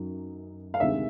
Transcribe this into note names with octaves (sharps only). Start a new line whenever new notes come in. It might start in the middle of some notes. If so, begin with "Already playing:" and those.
Already playing: F#2 D#3 F#3
F5
D2 C3 D#3 G#3 E5